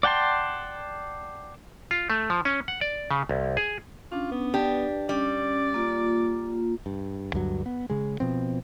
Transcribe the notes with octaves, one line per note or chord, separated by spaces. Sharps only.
D5 F#5 G5 A5 C6
F4
A3
F3
C#4
F#5
D5
C#3
C2
G#4
C#4 D4 F4
B3
D4 G4 B4
G3 C#4 D5
A#3 F4
G2
D2 G2 F#3
B3
C#3 G#3
B2 F3 C4